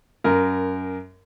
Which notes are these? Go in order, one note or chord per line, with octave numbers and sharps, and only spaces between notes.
F#2 A#4